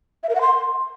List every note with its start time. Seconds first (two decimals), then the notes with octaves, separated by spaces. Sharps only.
0.23 E5
0.29 A#4
0.35 F#5
0.41 C6